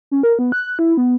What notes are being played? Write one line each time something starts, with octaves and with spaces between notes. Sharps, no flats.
C#4
A#4
B3
F#6
E4
B3